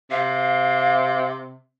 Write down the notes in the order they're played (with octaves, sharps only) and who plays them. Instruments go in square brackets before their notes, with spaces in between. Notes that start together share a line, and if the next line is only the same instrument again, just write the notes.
[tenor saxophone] C3 [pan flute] F5